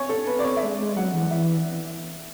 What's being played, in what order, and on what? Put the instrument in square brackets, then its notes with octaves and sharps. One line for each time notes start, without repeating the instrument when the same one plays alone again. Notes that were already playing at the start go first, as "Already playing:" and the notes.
Already playing: [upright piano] C#5 G#5
A4
B4
D5
C#5
E5
[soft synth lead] G#3 [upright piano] D5
[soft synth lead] G#3
[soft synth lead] F#3 [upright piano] F#5
[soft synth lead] E3
[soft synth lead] E3 [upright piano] E5